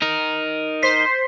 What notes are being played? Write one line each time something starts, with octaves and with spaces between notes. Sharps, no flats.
D#4 A#4
C5 C6 B6 C7